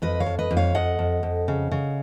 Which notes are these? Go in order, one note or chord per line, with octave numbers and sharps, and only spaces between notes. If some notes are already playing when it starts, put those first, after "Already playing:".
F2 B4 D#5
C#5 F5
F2
B4 D#5
F2
C#5 F5
F2 D#5 F#5
F2
F2
C#3
C#3